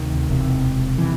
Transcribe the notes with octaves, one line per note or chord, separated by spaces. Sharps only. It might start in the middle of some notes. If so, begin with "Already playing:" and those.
Already playing: D2 C3 D#3
E1 E2 C3
C3 E3